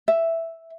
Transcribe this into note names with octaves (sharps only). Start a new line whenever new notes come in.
E5